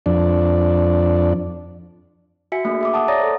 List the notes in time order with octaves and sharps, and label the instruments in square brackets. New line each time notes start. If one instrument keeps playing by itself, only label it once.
[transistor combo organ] F2 D4
[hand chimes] F#4 E5 G#5 B6 C#7
A3 A#3 D4 G#4
G#4 E5 D6
F#5 A5 D6 D#6
C#5 D5 A#5 D#6 A6 A#6
A4 C5